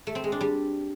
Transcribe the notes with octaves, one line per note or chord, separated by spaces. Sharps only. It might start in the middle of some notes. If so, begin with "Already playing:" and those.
A3
C4
G#3
D4
G3